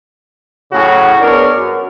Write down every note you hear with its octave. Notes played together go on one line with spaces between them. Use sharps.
A2 C#3 F#3 C#4 F#4
B3 D4 G#4 A#4 C#5
F#2